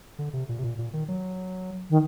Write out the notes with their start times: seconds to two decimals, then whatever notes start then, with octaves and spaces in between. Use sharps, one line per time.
0.19 D3
0.33 C3
0.49 A#2
0.59 C3
0.64 A#2
0.79 A#2
0.93 D#3
1.08 F#3
1.90 D#3